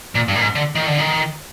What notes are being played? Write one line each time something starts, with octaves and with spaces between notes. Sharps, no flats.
A#2
G2
A#2
G#2
D3
D#3
D3
D#3